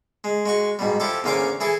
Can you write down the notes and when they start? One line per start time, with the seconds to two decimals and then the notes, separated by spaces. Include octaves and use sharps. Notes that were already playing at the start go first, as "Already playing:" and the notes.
0.24 G#3
0.46 G#3 F#4 C#6
0.79 G#2 B2 G3
1.00 F3 E4 G4 A4
1.24 E2 D3 A#3 C#4 C5 D6
1.60 E3 E4 G#4 A4